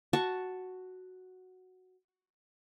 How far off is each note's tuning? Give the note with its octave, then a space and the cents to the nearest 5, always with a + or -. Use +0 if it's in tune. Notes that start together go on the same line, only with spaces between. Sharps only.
F#4 +0 A5 +0 C#6 +0